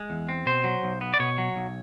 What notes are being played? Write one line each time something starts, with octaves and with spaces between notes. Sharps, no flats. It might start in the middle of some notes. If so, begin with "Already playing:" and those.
Already playing: G#3
E2
C4
B2 C5
F#3
B1
B3
D5
B2 C#5
F#3
B1